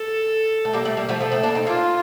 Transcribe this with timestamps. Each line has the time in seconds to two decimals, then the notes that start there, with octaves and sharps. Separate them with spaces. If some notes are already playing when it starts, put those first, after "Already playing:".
Already playing: A4
0.65 A3
0.73 G3 A#3
0.85 A3 C4
0.97 G3 A#3
1.09 F3 A3
1.21 F3 A3 A4
1.32 A3 C4
1.43 A#3 D4
1.55 C4 D#4
1.66 A#3 D4 F4